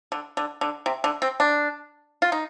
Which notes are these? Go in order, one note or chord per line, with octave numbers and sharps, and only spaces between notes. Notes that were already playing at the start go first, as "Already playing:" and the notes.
D3
D3
D3
C3
D3
C4
D4
F4
D#4